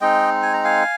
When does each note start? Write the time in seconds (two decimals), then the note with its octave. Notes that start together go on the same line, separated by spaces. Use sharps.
0.01 G#3 C4 D#4 D#5 G5
0.42 G#5
0.53 A#5
0.64 F5 G#5